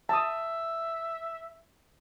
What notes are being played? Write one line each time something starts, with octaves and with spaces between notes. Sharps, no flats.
E5 A5 D#6